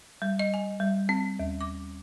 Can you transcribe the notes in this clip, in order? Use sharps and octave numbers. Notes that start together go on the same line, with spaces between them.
G3
D#5
G#5
G3
C4
D#2
D6